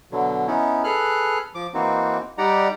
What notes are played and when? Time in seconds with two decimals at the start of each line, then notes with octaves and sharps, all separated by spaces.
0.12 B2 D3 F#3
0.47 B3 C#4 D#4 E4
0.84 G#4 A4 B4 F6 F#6
1.55 F3 D6
1.74 E3 A#3 C4 D#4 F#4
2.38 G3 D#4 G4 D5 F#5 A#5